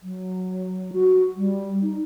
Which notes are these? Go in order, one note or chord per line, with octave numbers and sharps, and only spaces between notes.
F#3
F#4
G3
D#4